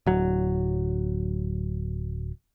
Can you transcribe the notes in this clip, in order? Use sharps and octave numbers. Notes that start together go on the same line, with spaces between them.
D1 F#3